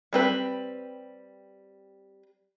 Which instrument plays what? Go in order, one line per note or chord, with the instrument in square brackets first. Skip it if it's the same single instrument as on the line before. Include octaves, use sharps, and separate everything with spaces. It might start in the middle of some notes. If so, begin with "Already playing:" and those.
[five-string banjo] G3 C4 B4